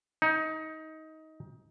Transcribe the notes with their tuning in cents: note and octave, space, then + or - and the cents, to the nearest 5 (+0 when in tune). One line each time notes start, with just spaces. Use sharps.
D#4 +20